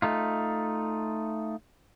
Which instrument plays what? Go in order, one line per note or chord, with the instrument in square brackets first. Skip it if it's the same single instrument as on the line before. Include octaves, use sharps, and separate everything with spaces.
[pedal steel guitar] A3 D#4 F4